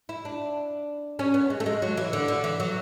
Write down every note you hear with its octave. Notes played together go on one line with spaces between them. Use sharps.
E4
D4
C#4
B3
G#3
A3
G#3
F#3
E3
D3
D3
E3
F#3